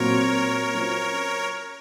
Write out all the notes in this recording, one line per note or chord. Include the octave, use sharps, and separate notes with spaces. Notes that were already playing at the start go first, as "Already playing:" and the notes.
Already playing: A#2 F#3 C4 A#4 C#5
F#3 C#4 F4 C5